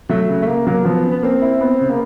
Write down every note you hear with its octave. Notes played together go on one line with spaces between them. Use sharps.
F#3 A3
C#3
A3
C#3 A#3
F#3 A#3
F3 B3
C#4
B3
A#3 C4
E4
B3
C#3
A#3